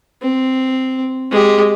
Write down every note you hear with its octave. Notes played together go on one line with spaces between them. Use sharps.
C4
G#3 G4